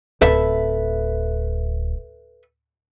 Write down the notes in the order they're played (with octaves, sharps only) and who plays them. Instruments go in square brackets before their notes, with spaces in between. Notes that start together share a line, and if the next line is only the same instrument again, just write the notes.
[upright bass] D1 [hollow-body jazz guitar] A4 B4 E5